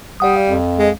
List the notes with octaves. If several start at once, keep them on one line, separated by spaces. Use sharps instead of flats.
G3 D5 F#5 D#6
F5
F2
G#3